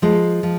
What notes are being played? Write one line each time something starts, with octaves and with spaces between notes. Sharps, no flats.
F3 G#3
F3